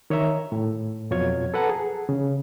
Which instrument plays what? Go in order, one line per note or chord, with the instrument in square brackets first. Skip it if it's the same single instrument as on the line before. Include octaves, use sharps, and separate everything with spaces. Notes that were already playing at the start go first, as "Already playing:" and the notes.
[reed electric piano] D#3 C#5 D#5 E5 A#5
A2
F2 B2 F#3 F4 C#5 G#6
A4 B4 F#5 A5 A#5
G#4
C#3